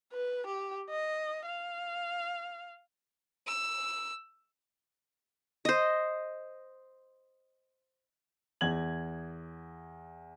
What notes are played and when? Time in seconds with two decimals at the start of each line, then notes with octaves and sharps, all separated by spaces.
0.12 B4
0.46 G4
0.90 D#5
1.46 F5
3.47 E6
5.65 C5 D#5
8.61 E2 G#6 F#7